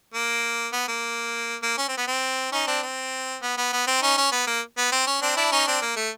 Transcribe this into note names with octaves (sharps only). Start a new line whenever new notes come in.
A#3
B3
A#3
A#3
C#4
C4
B3
C4
C#4 D#4
C4 D4
C4
B3
B3
B3
C4
C#4 D#4
C#4
B3
A#3
B3
C4
C#4
C4 D4
D4 E4
C#4 D#4
C4 D4
A#3
A3